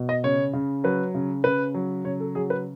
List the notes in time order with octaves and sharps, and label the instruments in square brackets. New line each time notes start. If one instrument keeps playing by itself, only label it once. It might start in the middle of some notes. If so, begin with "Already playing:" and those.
Already playing: [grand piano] B2
D#5
C#3 C#5
C#3
F#3 B4
C#3
C#3 B4
F#3
C#3 C#5
A4
F#3 G#4
B4